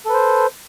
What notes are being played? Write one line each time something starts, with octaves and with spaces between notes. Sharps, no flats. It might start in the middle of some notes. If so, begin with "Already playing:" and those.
A4 B4 C5